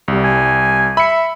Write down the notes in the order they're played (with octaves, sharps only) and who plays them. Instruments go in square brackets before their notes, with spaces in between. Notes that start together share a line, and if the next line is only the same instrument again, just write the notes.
[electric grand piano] C2 G3
[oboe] G#5
[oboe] E5 [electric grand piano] B5 C#7